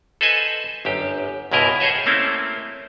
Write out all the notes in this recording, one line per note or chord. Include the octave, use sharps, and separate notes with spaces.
A4 B4 C5 D#5 G#5
G1 F#2 G4
C#2 G#2 B2 E4 A#4 D#5
G#4 C5 C#5 D#5 E5
A3 A#3 C4 C#4 E4